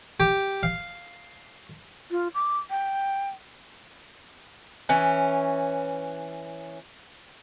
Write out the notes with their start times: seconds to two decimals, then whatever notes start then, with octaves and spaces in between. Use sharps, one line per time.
0.20 G4
0.63 F5
2.11 F4
2.34 D6
2.70 G5
4.89 E3 C#4